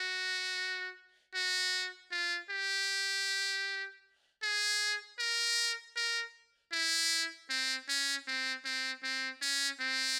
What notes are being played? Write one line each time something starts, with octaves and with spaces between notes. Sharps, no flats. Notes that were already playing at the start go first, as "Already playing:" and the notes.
Already playing: F#4
F#4
F4
G4
G#4
A#4
A#4
E4
C4
C#4
C4
C4
C4
C#4
C4